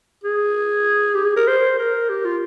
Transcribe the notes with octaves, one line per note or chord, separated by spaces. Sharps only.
G#4
G4
G#4
A#4
C5
A#4
G4
F4